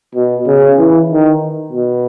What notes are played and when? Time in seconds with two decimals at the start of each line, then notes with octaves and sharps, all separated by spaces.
0.15 B2
0.47 C#3
0.78 E3
1.10 D#3
1.72 B2